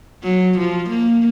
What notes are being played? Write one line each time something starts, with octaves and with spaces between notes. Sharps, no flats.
F#3
F3
A#3